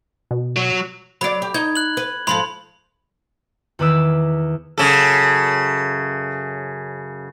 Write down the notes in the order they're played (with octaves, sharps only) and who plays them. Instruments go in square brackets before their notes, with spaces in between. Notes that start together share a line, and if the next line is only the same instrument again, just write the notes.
[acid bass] B2
[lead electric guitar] F#3
[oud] F#3 D5 [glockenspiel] B5
[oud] G4
[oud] D#4 [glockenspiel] G#6
[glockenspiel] F#6 F#7
[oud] B4
[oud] G#2 F3 A4 [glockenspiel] B5 C6 F#7
[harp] E2 D#3 B4 D6 E6
[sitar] F#2 C#3 A4